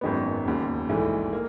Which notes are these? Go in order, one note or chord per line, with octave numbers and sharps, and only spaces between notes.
G#1 F#2 D#3 G#3 B3
E1 D#2 C#3
A#1 G#2 E3 A3
A#3